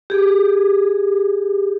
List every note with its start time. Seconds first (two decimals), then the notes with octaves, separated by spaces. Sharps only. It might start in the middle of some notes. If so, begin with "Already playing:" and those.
0.10 G4 G#4